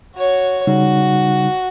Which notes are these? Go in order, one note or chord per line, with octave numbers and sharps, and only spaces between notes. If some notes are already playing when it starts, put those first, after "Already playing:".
F#4 C#5
C#3 G3 D#4 F#4